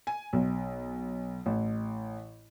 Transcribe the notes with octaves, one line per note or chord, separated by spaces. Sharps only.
G#5
B1
A1